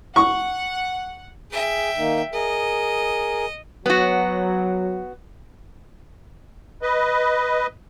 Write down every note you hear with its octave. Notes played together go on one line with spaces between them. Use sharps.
F#5 C#6
G#4 E5 G5
D#3 A#3 D#4
G#4 A#4 D#5
F#3 B3 F#4
B4 D#5